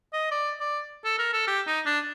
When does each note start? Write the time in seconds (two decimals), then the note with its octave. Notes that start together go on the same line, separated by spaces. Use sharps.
0.13 D#5
0.31 D5
0.60 D5
1.05 A4
1.19 A#4
1.33 A4
1.47 G4
1.67 D#4
1.86 D4